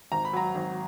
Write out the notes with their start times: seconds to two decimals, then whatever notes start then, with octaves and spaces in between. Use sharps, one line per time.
0.12 G#1 A#5
0.25 B5
0.33 F#3 A#5
0.55 G#1